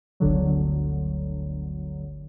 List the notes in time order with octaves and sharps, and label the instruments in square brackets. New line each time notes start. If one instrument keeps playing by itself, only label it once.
[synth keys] G1 D2 D3 F#3